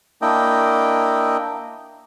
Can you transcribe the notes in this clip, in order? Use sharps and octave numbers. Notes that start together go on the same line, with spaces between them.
A#3 D4 E4 D#5 G5